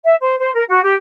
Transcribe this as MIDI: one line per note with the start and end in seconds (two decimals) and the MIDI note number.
0.04 0.15 76
0.20 0.35 72
0.39 0.52 72
0.54 0.63 70
0.69 0.81 66
0.83 0.94 67